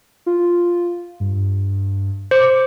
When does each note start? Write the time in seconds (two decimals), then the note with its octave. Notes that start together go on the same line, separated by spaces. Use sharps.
0.26 F4
1.20 G2
2.31 C5 D6